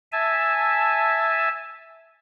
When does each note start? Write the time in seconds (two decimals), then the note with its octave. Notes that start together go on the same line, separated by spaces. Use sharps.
0.12 E5 G#5 A5